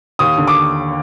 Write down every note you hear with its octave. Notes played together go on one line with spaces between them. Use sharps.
D#2 D#6
D3
D6